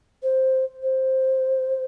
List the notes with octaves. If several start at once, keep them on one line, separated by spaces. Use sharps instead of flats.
C5
C5